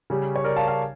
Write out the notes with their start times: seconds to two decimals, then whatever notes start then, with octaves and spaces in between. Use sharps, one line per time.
0.10 C#3 G3 C#4
0.36 C#5
0.44 A#4 D5
0.56 F5 A5
0.68 F5 A5